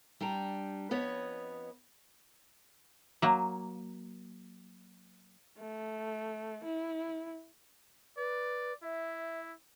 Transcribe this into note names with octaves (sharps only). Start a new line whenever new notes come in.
G3 D4 G5 A#5
F2 B3 B4 C#5 D#5
F#3 A#3
A3
E4
B4 D5
E4 E5